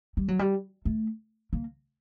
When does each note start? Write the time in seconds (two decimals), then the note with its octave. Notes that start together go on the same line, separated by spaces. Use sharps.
0.17 G3
0.28 F#3
0.39 G3
0.85 A3
1.53 A#3